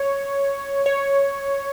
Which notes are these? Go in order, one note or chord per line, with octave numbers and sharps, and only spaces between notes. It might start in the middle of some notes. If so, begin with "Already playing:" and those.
Already playing: C#5
C#5